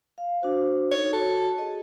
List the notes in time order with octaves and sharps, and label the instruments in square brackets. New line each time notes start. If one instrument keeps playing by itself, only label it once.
[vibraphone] F5
D4 F#4 C5
[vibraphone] D#4 A4 [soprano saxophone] C#5
[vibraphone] F#4 [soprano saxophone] A4
[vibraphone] G#4 A4 D#5